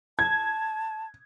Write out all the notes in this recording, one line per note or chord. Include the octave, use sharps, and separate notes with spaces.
A5 G#6